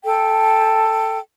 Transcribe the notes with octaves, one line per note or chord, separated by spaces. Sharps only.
A4 G5